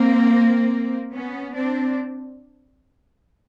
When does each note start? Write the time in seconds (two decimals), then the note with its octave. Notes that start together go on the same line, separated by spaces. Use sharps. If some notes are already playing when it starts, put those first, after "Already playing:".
Already playing: A#3 C4
1.12 B3 C#4
1.55 C4 D4